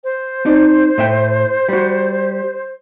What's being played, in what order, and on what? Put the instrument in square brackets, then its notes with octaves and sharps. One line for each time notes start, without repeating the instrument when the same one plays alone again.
[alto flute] C5
[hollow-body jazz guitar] C4 D#4 D5
A2 E5 G5
G3 F#4